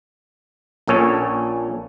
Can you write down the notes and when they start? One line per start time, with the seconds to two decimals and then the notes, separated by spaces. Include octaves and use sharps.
0.88 A#1 A#2 C#4 A4 C#5